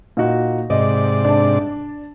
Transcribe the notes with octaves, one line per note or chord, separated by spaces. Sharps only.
A#2 D#4 F#4
G#2 C3 D5 D#5
D4 A5